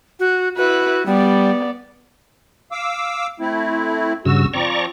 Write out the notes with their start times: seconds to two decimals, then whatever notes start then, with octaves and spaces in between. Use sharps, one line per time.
0.20 F#4
0.57 E4 F#4 B4
1.06 G3 B3 D5
2.72 F5 D6 E6
3.40 A3 C4 E4
4.25 G2 C#3 F#4 E6
4.53 F3 C4 D5 A#5 C#6